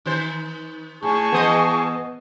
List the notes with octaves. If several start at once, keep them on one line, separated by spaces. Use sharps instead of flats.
D#3 C5
A2 G#4 A5 C#6
E3 B3 C5 D#5 D#6